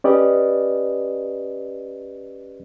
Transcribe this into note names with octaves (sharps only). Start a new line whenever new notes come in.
C#4 G4 B4 D5 D#5